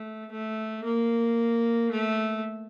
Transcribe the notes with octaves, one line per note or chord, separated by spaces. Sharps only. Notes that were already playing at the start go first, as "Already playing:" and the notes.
Already playing: A3
A3
A#3
A3